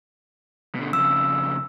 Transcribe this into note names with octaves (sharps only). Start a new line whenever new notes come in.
B2 D3
F2 C#3 E6